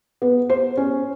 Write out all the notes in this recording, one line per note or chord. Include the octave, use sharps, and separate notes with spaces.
B3
C5
C#4